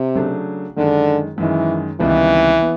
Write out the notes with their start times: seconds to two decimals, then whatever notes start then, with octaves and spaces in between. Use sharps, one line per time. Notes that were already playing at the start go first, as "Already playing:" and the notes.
Already playing: C3
0.16 C#3 F#3 A3 D4
0.76 F#2 D3 D#3 G#3
1.38 F#2 D#3 E3 G#3
2.00 C#2 C3 D#3 E3 G3 B3
2.62 B3